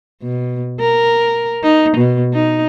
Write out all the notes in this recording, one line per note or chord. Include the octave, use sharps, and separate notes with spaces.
B2
A#4
D#4
B2
D#4